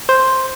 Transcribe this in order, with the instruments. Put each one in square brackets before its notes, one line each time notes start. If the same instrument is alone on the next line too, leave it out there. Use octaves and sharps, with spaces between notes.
[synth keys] C5